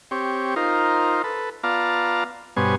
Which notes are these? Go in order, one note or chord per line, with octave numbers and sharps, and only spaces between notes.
C4 G4 C#5
D#4 F4 A#4 C5
A4 B4
B3 F4 D5 F5 A5 A#5
G2 B2 B3 C5 C#5 G#5